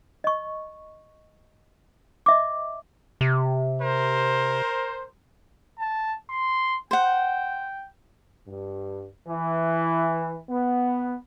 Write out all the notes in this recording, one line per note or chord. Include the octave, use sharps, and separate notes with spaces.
D#5 C#6
D#5 E5 D6
C3
A#4 C5
A5
C6
C5 F#5 G5
G2
E3
B3